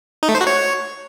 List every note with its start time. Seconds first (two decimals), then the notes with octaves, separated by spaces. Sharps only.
0.23 D#4
0.29 A3
0.35 C5
0.41 F#4
0.47 C#5